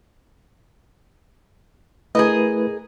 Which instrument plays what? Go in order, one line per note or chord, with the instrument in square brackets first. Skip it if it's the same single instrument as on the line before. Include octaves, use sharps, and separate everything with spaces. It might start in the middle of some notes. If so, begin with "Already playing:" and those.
[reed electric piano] A3 E4 B4 [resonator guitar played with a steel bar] G#4 A#4 D#5